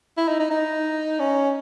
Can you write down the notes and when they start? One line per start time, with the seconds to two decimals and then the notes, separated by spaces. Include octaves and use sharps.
0.17 E4
0.28 D#4
0.39 D#4
0.51 D#4
1.19 C#4